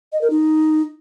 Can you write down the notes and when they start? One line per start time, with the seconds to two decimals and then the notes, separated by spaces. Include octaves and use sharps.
0.12 D#5
0.21 A#4
0.30 D#4